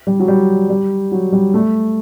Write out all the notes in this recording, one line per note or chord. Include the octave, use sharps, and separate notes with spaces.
G3
F#3
G3
G3
F#3
G3
A3